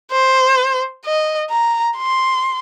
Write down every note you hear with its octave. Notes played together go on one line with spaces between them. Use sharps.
C5
D#5
A#5
C6